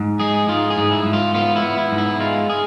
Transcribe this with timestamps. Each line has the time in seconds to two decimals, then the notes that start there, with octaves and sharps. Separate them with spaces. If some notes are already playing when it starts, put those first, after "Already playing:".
Already playing: G#2
0.19 G#3 G#4
0.48 G#2 F4
0.70 G#4
0.78 G#2
0.91 E4
1.05 G#2
1.13 F4
1.34 B3 F4
1.56 E4
1.62 B3
1.78 E4
1.92 G#2
1.98 E4
2.20 G#3 F4
2.50 G#4